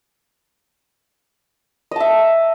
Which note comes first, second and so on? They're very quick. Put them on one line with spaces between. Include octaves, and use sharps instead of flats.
D#5 A5 E5